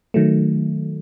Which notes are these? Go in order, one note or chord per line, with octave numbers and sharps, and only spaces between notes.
D#3 F#3 A3